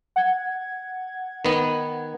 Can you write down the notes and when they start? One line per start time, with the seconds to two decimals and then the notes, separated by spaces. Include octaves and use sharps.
0.16 F#5 G#6
1.45 D#3 B3